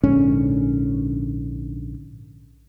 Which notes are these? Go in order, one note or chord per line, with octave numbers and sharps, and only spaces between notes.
A#1 G#2 D3 C#4